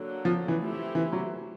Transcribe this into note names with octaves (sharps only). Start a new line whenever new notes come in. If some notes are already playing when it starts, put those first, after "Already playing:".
Already playing: D3 F#3 A#3
F3
E3
A3 C4 E4 G4
E3
F#3